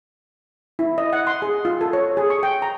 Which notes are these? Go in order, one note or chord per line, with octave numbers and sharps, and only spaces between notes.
E4
D#5
F#5
C6
G#4
F4
A4
C#5
G#4
C#6
G5
A#5